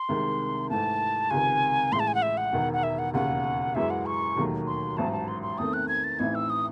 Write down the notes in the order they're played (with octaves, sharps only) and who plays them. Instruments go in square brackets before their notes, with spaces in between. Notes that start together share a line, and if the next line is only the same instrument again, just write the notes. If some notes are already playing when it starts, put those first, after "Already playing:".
Already playing: [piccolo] C6
[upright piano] C2 C3 D#3 G#3
[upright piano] G#2 E3 A3 [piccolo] A5
[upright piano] C#2 C3 D#3 [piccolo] G#5
[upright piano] A1 A2 G#3 [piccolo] C6
[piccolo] A5
G#5
F#5
E5
F#5
[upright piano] E1 E2 D#3
[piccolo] F#5
E5
F#5
[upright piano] E1 D#2 C#3 [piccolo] F#5
[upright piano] F#2 E3 G#3 [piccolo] E5
[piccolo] F#5
C#6
[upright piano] E1 D#2 D#3 F#3 A3
[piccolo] C6
[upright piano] A1 G#2 F#3 [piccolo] A5
[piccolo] A5
C6
C6
[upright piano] E2 D#3 A3 C4 [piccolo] D#6
[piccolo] F#6
G#6
A6
[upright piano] A1 A2 E3 C4 D#4 [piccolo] G#6
[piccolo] E6
D#6